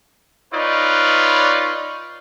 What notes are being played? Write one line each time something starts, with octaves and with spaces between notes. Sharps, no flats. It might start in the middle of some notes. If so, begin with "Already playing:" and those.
D#4 F4 B4 C#5 D5